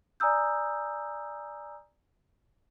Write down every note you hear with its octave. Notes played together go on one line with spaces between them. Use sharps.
D5 G#5 A#5 D#6 E6 G6